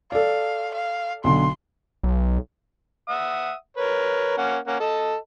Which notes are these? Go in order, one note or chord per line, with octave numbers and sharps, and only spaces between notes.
A4 D5 F5
F5
B1 D3 C6
B1
E5 F#5 D#6
A#4 B4 C#5
A#3 C#4 F#5
A#3 C#4 F#5
A4 D#5 A5